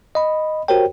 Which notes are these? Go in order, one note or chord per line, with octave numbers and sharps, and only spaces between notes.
D#5 B5
F#4 G4 A#4 C5 C#5 G5